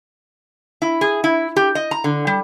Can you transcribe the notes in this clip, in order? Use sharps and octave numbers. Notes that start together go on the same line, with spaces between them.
E4
G#4
E4
G4
D#5
A#5
D3
G3